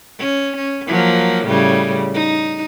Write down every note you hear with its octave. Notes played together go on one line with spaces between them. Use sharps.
C#4
C#4
F3 F#3 A#3
A2 C#3 G3
D#4